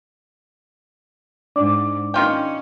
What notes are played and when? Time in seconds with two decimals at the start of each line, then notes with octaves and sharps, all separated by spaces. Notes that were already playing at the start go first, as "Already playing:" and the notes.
1.56 G#2 D4 D5 D6
2.14 D#3 C#4 F4 G5